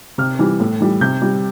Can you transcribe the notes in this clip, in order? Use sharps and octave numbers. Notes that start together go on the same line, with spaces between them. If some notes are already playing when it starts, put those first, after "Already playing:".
C3 F6
E3 G3
A2
E3 G3
C3 G6
G3